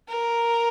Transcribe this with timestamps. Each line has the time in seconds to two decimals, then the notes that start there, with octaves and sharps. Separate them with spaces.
0.08 A#4